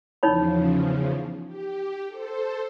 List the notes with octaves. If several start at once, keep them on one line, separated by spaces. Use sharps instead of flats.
E2 C#3 F3 D#4 C#5 B5
G4
A4 C5